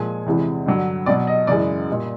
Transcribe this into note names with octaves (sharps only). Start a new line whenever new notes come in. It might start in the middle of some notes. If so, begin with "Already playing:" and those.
Already playing: A#2 F3 G#3 G#5
E2 C3 E3 G#3
G2 D3 F#3
B2 F#3 D5
D#5
F#2 C#3 E3 G#3 D5
A#2 G3